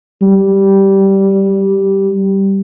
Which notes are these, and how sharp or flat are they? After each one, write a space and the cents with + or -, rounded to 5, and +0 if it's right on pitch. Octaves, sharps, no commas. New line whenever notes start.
G3 -10